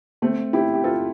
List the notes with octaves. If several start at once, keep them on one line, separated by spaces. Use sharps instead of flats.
A3 C4
E4 G4
G4
F4 A4